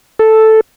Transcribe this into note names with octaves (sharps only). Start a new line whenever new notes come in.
A4